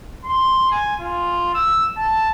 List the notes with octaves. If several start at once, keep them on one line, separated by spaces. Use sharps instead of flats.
C6
G#5
F4
E6
A5